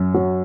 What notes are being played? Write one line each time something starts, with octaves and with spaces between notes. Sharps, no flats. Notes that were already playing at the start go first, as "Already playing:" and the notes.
Already playing: F#2
F#3